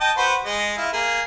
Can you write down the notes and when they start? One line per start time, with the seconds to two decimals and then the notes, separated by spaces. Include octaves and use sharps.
0.01 D#5 G5 A5
0.17 F#4 B4 C5
0.45 G#3 D#5
0.77 E4 F4
0.93 A#3 G#4